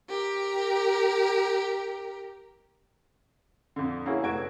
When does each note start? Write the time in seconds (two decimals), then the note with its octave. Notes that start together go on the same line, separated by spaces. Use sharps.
0.10 G4 A#4
3.76 F2 D3
4.06 A#3 C#4 E4 F#4 G#4
4.23 F1 A3 F#4 G#6 D7